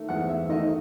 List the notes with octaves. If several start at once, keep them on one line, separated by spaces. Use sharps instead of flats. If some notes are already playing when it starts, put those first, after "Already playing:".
Already playing: D#3 A3
E2 F#5
E5
D#3 A3 D#5